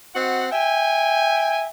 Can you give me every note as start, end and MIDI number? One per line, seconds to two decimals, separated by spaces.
0.15 0.47 60
0.15 0.47 66
0.15 0.47 75
0.15 0.47 78
0.52 1.67 76
0.52 1.67 79
0.52 1.67 80